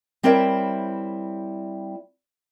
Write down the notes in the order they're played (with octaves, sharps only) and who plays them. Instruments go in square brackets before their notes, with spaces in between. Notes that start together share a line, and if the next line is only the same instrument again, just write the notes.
[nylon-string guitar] G3 C4 E4 A#4 C#5 E5